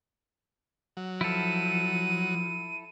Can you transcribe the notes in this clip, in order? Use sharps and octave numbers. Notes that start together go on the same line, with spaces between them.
F#3
F3 E4 A4 D#7